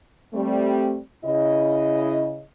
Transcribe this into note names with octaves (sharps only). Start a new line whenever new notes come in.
G3 A3 C4
C#3 E4 D#5